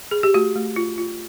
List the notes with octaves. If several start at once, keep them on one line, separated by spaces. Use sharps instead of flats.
G#4
G4
A3 F#4
A3
F4
F4